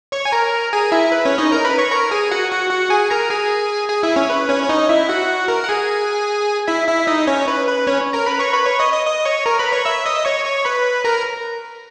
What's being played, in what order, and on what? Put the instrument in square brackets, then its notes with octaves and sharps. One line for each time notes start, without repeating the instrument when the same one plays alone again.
[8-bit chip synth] C#5 C#6
G#5
A#4 A#5
G#4 G#5
E4 E5
B4
C#4 C#5
D#4 D#5
A#4 A#5
B4 B5
C#5 C#6
A#4 A#5
G#4 G#5
F#4 F#5
F#4 F#5
F#4 F#5
G#4 G#5
A#4 A#5
G#4 G#5
G#4 G#5
E4 E5
C#4 C#5
B4
C#4 C#5
C#5
D#4 D#5
E4 E5
F#4 F#5
A#4 A#5
F#5
G#4 G#5
E4 E5
E4 E5
D#4 D#5
C#4 C#5
B4
B4
C#4 C#5
A#4 A#5
B4 B5
C#5 C#6
B4 B5
C#5 C#6
D#5 D#6
D#5 D#6
D#5 D#6
C#5 C#6
A#4 A#5
B4 B5
C#5 C#6
E5 E6
D#5 D#6
C#5 C#6
C#5 C#6
B4 B5
A#4 A#5